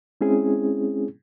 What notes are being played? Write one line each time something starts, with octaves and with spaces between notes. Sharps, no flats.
G#3 C4 C#4 E4 G#4